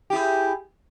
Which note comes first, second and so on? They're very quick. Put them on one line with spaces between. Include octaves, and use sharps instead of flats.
G4 E4 G#4